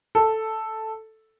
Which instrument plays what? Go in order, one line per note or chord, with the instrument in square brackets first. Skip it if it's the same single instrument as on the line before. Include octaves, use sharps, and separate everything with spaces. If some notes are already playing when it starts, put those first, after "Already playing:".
[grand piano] A4